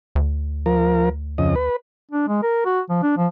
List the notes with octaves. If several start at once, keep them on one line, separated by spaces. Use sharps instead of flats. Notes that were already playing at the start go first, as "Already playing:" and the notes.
D2
F3 A#4
F2 C#3 D#5
B4
D4
G#3
A#4
F#4
F3
D4
F3